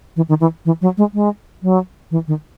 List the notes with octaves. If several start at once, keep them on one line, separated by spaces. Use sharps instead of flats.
E3
D#3
E3
E3
F#3
G#3
G#3
F#3
E3
D#3